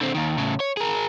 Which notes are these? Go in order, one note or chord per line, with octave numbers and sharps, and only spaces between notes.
D3 C4
D#2 D#3
A2 C#3
C#5
G#4 A#4